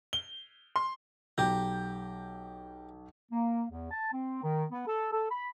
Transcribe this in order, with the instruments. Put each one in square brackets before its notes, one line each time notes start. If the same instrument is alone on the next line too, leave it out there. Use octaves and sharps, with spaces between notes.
[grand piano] G7
C6
[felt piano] B1 G6 [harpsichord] G4 A#5
[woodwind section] A#3
E2
A5
C4
D#3
B3
A4
A4
B5